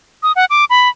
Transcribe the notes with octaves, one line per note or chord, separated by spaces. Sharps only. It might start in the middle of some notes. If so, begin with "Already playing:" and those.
D#6
F#5
D6
B5